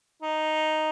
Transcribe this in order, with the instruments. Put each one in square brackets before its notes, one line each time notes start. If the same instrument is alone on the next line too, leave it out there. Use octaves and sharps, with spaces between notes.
[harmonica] D#4